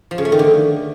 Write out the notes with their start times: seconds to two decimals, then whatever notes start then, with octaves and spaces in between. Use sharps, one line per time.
0.11 F3
0.18 C#3
0.25 A3
0.32 D#3
0.39 D3